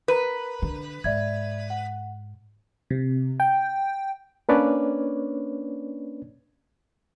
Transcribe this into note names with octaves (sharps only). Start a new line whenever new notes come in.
A#4 B4 A#5
D3
G#2 D5 E5 G#6
F#5
C3
G5
A#3 C#4 D4 B4 C#5 D5